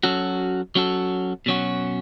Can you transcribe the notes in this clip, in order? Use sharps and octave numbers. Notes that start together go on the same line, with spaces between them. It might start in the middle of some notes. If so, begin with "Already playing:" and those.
F#3 C#4 F#4 A4
F#3 C#4 F#4 A4
B2 F#3 C#4 F#4